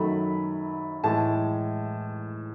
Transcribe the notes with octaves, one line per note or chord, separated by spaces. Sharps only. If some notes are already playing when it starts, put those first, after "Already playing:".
Already playing: F#2 D#3 F#3 A3 B5
A2 E3 G#3 A5